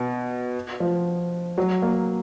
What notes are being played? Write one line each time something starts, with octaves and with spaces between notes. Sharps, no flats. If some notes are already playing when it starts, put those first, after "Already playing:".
Already playing: B2
F3
F#3
A#3